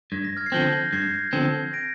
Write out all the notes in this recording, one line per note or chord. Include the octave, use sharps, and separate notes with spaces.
G2 G#6
A#6
F6 G#6
C7
D3 F3 C4 G6 A#6
G2 G#6 C7
D3 F3 C4
A#6 D7